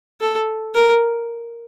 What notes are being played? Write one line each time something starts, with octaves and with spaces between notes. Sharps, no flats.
A4
A#4